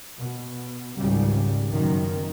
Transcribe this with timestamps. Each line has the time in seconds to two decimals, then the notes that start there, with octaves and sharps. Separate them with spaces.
0.18 B2
0.98 G#1 C#2 G#2 C#3 G3
1.70 F#1 F#2 B2 D#3